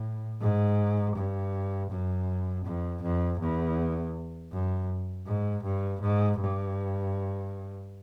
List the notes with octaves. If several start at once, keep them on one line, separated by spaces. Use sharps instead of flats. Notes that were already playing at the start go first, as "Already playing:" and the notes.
Already playing: A2
G#2
G2
F#2
F2
F2
E2
F#2
G#2
G2
G#2
G2